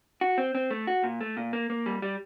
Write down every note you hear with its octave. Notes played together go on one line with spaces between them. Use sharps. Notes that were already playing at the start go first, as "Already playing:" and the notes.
F#4
C4
C4
A3
F#4
A#2
A3
A#2
A#3
A#3
G3
G3